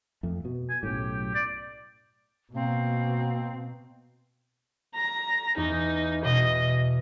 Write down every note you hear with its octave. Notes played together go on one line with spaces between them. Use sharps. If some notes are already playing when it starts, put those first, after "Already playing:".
F2 A3
B2
G#5
B1 F#2 A2 G4
D5
B2 A#3 C4
A#5
E2 D#4
B2 D#5